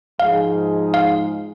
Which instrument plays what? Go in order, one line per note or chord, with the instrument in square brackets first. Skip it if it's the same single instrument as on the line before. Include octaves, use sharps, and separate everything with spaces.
[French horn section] G#2 F3 G#3 D#4 G#4 [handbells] F5
[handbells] F5